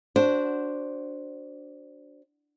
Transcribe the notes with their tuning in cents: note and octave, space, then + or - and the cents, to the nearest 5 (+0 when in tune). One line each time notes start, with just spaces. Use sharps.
D4 -10 F#4 +0 C5 +0